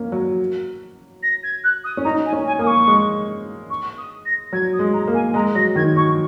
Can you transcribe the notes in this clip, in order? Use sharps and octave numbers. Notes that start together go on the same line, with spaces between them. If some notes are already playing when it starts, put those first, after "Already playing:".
Already playing: A#3 C#4
F#3
A#6
G#6
F#6
D#6
C#4
D#4 A#5
G#5
C#4
G#5
A#3 D#6
C#6
G#3
C#6
D#6
A#6
F#3 G#6
D#6
G#3
A#5
A#3
G#5
G#3 A#5
F#3 A#6
D#3 G#6
F#3 C#6